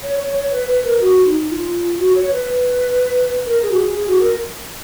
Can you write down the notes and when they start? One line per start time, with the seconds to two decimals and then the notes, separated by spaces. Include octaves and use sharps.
0.02 C#5
0.18 C#5
0.36 C#5
0.51 B4
0.67 B4
0.84 A#4
1.01 F#4
1.24 D#4
1.50 F4
1.98 F#4
2.15 C#5
2.31 B4
3.45 A#4
3.62 G#4
3.71 F#4
3.78 G#4
3.94 G#4
4.07 F#4
4.19 A#4